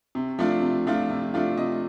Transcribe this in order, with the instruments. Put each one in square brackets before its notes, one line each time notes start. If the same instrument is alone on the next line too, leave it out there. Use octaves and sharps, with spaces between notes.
[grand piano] C3
F3 A3 D4 F4
C3
F3 A3 D4 F4
C3
F3 A3 D4 F4
C3 D#5